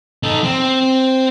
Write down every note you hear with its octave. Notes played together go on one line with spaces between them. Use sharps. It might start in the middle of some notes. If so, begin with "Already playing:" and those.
D#4 A4
C4